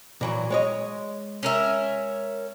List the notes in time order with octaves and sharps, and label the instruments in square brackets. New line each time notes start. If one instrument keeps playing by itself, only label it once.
[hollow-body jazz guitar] A#2 E3 F#3
G#3 C#5 D#5
[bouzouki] C#4 A#4 E5